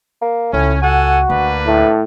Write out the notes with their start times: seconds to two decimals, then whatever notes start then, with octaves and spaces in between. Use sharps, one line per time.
0.22 A#3
0.53 C#2 A2 C#4
0.82 F#4 A4 F#5 G#5
1.29 D2 A#3 D4 B4
1.67 A2 A3